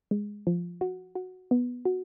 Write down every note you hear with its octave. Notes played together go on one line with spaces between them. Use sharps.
G#3
F3
F#4
F#4
B3
F#4